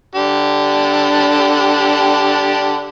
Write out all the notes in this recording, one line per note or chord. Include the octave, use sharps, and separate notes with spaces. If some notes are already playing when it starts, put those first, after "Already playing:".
D3 D4 G4